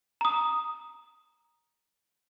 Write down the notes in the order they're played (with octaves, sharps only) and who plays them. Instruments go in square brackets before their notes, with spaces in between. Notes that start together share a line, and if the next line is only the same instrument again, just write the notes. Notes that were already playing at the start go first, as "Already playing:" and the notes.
[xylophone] A#5 D#6